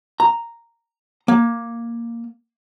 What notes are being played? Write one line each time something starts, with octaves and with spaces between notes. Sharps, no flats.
A#5
A#3